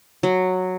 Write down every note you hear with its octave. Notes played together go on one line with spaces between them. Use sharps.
F#3